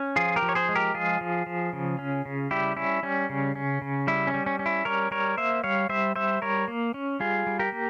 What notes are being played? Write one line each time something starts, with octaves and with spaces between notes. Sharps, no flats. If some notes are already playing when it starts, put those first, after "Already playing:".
Already playing: C#4
F3 F4 G#4
G4 A#4
F3
C#5
G#4 C5
G#3
G4 A#4
F3 F4 G#4
F3
F3
C#3
C#4
C#3
G3 E4 G4
C#4 E4
G3 C#4
C#3
C#4
C#3
G3 E4
C#4
G3
C#4
C#4
E4
G3 A#4 C#5
G3 A#4 C#5
A#3 C5 E5
G3 C#5 F5
G3 C5 E5
G3 C5 E5
G3 A#4 C#5
A#3
C#4
G3 F4 G#4
G3
G4 A#4
A#3